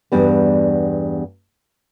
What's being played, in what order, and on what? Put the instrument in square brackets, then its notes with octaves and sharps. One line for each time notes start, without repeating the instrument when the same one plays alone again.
[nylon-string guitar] E2 G2 G3 B3